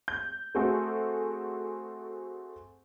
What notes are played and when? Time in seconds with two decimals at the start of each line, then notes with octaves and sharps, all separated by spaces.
0.08 G6
0.55 A3 C4 F#4 G#4 A4